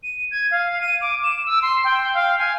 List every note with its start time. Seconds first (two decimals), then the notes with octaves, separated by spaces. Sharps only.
0.03 D#7
0.31 G#6
0.51 F5
0.81 D#7
1.01 D6
1.24 E7
1.46 E6
1.62 C6
1.84 G5
2.14 F5
2.38 G#5